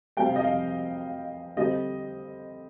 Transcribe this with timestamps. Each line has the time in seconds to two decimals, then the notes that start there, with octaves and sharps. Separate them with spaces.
0.17 C3 G3 C4 G5
0.26 F5
0.36 D#5
0.44 F5
1.57 D3 G3 C4 D#5